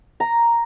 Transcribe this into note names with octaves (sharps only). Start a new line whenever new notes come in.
A#5